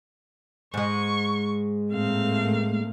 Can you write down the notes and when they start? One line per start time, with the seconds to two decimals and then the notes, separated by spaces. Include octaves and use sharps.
0.74 G#2 G#3 C#6
1.91 A2 A3 A#3 C4 F5